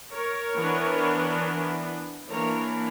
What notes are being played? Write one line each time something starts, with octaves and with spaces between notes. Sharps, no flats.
A#4 C#5
E3 B3 D4
E3 A#3 D4 A#4 C#5